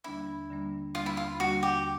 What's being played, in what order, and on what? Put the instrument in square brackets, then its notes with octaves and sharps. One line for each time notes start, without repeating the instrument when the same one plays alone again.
[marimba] D#2 D3 G3 A#3 D4 [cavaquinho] E4
[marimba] D#2 D3 G3 A#3 D4
[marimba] D#2 D3 G3 A#3 D4 [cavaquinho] F4
[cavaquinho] E4
F4
[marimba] D#2 D3 G3 A#3 D4 [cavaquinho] F#4
[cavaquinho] G4